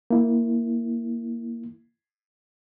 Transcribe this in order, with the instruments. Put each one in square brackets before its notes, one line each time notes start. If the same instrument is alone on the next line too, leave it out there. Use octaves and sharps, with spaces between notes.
[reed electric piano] A#3 E4